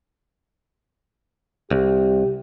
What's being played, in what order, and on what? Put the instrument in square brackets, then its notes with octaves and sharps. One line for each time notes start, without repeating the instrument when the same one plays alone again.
[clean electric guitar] C2 [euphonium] G4